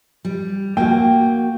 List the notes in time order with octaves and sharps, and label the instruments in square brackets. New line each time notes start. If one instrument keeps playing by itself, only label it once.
[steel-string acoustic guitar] G3
[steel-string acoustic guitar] A#3 F#4 [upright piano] G5